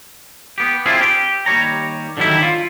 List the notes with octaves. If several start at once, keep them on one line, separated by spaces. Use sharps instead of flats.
B3 G4
C4 D4 E4 F4 G#4
G4
D#2 G3 C#5 A#5
D3 D#3 F#3 G3 E4
F4